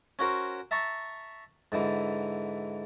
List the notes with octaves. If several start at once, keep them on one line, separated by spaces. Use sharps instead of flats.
C#4 F#4 A#4 C5
E5 A5 A#5 C#6
G#2 D3 E3